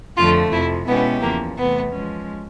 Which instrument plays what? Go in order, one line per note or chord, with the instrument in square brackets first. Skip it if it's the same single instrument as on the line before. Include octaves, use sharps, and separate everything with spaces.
[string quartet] F2 D3 F3 A3 [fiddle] F4
[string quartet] F2 C3 F3 [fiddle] E4
[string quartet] B2 G#3 C#4 E4 G4 [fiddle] B3
[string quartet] E2 C#3 F3 [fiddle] A#3
[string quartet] E2 C3 E3 A3 [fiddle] B3
[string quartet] F3 G#3 C#4